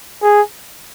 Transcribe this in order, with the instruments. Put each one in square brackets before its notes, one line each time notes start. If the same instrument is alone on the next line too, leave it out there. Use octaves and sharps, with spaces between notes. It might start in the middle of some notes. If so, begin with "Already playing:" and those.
[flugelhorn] G#4